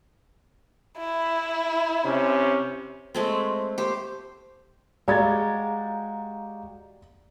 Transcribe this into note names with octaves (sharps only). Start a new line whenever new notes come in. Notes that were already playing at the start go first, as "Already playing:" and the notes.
E4
C3 C#4
G#3 A3 C4
G4 C5
G#3 F#4 G4 D5 F5 A#5 G#6 A6